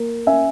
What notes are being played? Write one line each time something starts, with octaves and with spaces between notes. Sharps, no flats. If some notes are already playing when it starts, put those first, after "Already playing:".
Already playing: A#3
C#4 E5 G#5